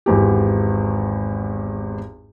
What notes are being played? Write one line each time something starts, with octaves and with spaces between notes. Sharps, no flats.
G#1 E2 G4